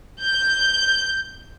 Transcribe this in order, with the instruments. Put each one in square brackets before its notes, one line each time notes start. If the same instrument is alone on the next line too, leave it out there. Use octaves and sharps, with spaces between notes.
[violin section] G6